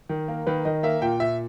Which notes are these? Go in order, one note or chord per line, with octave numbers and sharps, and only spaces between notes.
D#3
A#3
D#3 B4
D#3 D#5
A#3 E5
A#2 G5
A#2 E5